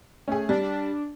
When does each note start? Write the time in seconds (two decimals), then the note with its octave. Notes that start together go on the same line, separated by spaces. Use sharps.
0.28 A3 C#4 G#4
0.49 G3 D4
0.61 D4